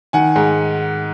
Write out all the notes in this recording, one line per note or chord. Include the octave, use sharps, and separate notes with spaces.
D#3 F#5 G#5
G#2